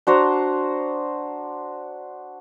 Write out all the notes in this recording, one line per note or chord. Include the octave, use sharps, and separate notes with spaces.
D4 F#4 C5 A#5